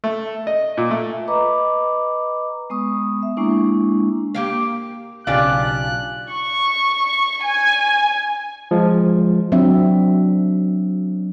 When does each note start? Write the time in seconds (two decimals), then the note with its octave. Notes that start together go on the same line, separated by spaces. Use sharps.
0.04 A3
0.47 D#5
0.77 A#2
0.91 A3
1.28 B4 D#5 A#5 B5 D6
2.70 G#3 B3 C#6 D#6
3.23 E5
3.37 G#3 A#3 D4 E4 C#6
4.34 A#3 G4 F5
5.27 B1 C#3 D4 F4 G4 F5 G#5 F#6
6.32 C#6
7.44 G#5
8.71 F3 G#3
9.52 F#3 C4 D4 E5